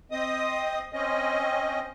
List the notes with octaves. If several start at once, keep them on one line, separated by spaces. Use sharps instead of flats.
C4 D#5 D#6
C4 C#4 D#5